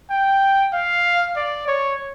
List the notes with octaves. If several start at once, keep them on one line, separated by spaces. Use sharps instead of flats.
G5
F5
D5
C#5